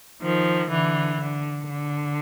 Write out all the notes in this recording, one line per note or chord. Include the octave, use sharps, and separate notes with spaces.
D#3 F3
D3 E3
D3
D3